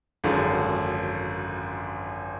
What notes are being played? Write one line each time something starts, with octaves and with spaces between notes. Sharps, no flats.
G#1 F#2 D3 F3 G#3